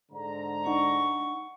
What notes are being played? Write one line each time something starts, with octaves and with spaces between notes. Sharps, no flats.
G#2 D3 A#5
D4 D#4 F#5 C#6